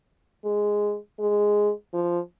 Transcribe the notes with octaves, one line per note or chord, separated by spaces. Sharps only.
G#3
G#3
F3